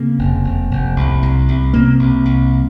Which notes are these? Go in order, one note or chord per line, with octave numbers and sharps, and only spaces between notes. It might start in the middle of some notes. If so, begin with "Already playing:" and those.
Already playing: C#3 A#3 C4
F1
F1
F1
C2
C2
C2
C3 A#3 C4
C2
C2